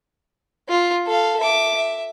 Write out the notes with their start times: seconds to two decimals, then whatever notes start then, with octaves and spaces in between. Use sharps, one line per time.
0.69 F4
1.07 A4 F5
1.39 E5 D6
1.77 E5